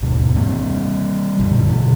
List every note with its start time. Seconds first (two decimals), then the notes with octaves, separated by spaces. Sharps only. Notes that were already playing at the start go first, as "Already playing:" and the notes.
0.02 D#2 G#2 B2
0.36 G3 A#3 C4
1.39 F#2 A#2 D3 E3
1.68 B2 D3 E3